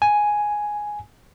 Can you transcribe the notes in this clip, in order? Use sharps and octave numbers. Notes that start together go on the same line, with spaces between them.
G#5